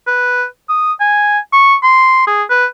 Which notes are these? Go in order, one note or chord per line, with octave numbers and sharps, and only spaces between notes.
B4
D#6
G#5
C#6
C6
G#4
B4